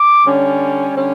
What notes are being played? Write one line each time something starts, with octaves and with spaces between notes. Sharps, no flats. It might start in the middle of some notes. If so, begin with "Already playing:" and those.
Already playing: D6
D3 G3 C#4
D3 G3 C#4